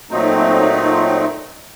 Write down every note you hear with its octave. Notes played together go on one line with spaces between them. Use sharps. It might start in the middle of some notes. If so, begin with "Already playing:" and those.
A#2 F#3 A3 C4 D#4